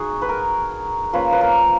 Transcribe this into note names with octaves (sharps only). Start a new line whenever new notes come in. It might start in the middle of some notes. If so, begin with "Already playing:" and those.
Already playing: G#3 D#4 F#4 G#4
B4
A#4
F3 A#3 C#4 F4 B4
B4
A#4